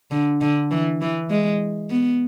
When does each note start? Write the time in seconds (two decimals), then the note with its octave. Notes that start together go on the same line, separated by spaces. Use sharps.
0.11 D3
0.41 D3
0.71 E3
1.01 E3
1.30 G#3
1.90 B3